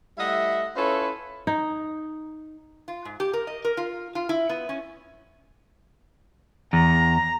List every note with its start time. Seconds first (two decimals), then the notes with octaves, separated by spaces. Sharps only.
0.18 G3 A3 E4 D#5 E5 F#5
0.76 C#4 E4 F4 A4 B4 C#5
1.47 D#4
2.88 F4
3.05 G#2
3.20 G4
3.33 A#4
3.47 D#5
3.65 A#4
3.77 F4
4.15 F4
4.29 E4
4.49 B3
4.69 C#4
6.73 E2 A#5